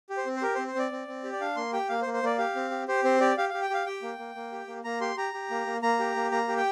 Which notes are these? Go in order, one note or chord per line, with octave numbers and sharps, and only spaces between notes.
G4
C5
C4
C5
G4 A#4
C4 C5
C5
C4 D5
C4
C4
G4
D5
D4 F5
A#3 C6
G4 G5
A#3 F5
C5
A#3
C5
A#3 D5
G4 F5
C4
G4
G4 C5
C4 C5
G4 D5
G4 F5
G4 F5
G5
G4 F5
G4 G5
A#3
A#3
A#3
G4
A#3
A#3 A#5
G4 C6
G4 A#5
G4
A#3
A#3
A#3 A#5
G4
A#3
A#3 A#5
G4
G5